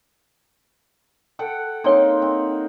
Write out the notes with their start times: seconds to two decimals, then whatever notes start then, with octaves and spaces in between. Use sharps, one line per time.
1.39 A4 F#5 G5
1.84 A#3 C4 D4 D#4 C#5 G5
2.22 C4